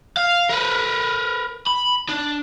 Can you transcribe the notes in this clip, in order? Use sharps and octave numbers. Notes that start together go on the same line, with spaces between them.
F5
A#4 B4
B5
D4